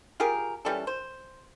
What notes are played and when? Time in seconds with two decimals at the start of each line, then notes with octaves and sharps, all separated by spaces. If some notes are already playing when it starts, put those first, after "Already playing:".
0.20 F4 G4 G#4 A#4
0.65 E3 G3 C#4 A4
0.87 C5